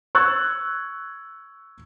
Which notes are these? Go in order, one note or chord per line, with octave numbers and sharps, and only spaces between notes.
C#6 E6 F#6 G#6 A6